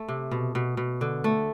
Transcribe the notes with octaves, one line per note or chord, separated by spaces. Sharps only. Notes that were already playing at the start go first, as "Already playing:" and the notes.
Already playing: A3
C3
B2
B2
B2
D3
A3